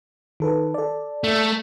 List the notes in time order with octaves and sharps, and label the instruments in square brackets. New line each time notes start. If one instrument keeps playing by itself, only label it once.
[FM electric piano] D#3 A4 B4
A4 D5
[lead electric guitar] A3